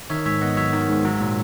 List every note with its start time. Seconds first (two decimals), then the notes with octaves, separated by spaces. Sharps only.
0.10 D#3 C#5 E5
0.26 G#2 C#5 E5
0.41 B3 D#5 F#5
0.57 F#3 C#5 E5
0.73 D#3
0.89 G#2
1.05 F#3
1.20 A#2